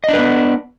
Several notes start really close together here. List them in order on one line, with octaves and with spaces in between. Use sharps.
D#5 D4 B4 B3